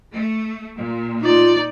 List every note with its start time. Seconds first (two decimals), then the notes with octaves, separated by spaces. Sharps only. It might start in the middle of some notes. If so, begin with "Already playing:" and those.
0.12 A3
0.76 A#2
1.21 D#4 F4 D5